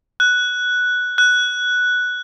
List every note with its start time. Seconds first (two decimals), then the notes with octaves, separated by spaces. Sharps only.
0.20 F#6
1.18 F#6